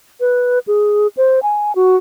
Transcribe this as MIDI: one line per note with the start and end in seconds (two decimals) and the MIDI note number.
0.20 0.59 71
0.67 1.07 68
1.17 1.39 72
1.43 1.72 80
1.75 1.96 66